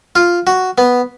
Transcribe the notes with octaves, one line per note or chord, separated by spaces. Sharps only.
F4
F#4
B3